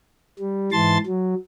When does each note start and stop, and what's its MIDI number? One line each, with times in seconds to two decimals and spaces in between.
0.39 0.70 55
0.72 0.98 44
0.72 0.98 52
0.72 0.98 81
0.72 0.98 84
0.72 0.98 93
1.07 1.35 54